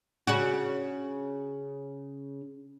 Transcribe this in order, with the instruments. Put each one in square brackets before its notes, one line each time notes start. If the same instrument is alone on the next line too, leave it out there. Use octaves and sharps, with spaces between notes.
[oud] C#3 C#4 F#4